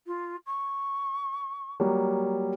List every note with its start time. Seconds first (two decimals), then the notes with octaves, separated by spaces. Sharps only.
0.07 F4
0.46 C#6
1.80 F#3 G3 A#3